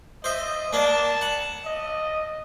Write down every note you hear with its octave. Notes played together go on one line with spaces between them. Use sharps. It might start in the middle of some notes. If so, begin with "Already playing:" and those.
C5 D#5 E5
A#3 D4 A5
F#5
D#5